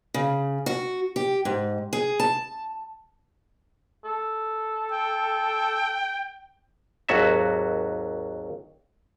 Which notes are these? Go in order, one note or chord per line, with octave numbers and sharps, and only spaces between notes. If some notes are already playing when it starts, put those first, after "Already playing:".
C#3
F#4
G4
G#2
G#4
A5
A4
G5
G#1 D#2 F#3 F#4 A4 E5